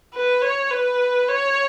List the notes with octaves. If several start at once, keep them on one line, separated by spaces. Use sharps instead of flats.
B4
C#5
B4
C#5